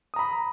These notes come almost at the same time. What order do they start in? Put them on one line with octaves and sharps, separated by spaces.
D#6 A#5 B5